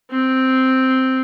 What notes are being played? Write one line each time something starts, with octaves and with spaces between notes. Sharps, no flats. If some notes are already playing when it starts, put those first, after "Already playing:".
C4